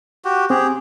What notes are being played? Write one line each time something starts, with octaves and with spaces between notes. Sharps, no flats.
F#4 G4
C4 G4 G#4